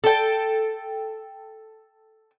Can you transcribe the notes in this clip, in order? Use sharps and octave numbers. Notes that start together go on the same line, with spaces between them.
A4 G5